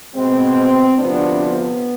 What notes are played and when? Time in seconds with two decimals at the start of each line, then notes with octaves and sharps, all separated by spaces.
0.14 B2 G#3 B3 C4
0.97 D2 C3 F3 B3 D4
1.39 B3